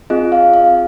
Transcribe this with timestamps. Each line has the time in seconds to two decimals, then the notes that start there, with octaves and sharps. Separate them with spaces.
0.10 C4 F4 G#4 D#5
0.32 F5
0.54 F5